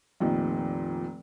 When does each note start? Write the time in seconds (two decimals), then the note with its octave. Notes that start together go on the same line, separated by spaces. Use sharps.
0.20 F1 A#2 D#3